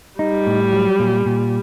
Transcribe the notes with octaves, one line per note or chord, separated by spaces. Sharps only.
G3 D#4
A2
F#3
A#2
A#2